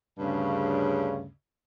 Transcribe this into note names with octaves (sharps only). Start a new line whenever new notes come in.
D2 G2 C#3